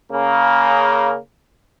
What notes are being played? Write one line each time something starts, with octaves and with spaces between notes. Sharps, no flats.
C#3 A#3